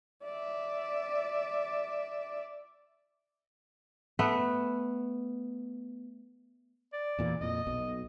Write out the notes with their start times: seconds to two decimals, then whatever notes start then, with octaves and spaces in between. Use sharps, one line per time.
0.23 D5 E5
4.19 A3 B3 B4
6.93 D5
7.19 E2 A#2 E3
7.41 F2 A#2 D#5
7.67 B1 B2